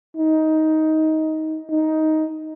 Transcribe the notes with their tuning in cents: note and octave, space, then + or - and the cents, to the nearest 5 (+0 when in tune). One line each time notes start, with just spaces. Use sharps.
D#4 +15
D#4 +10